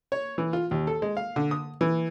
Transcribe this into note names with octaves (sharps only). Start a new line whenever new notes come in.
C#5
E3
F4
D#2
A4
G#3
F5
D3
D#6
E3